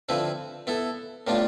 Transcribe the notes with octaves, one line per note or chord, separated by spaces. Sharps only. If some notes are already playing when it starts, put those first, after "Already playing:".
D3 F3 C4 E4 B4
B3 E4 A4
A2 G3 B3 D4 F4